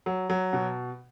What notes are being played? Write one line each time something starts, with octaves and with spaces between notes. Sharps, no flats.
F#3
F#3
B2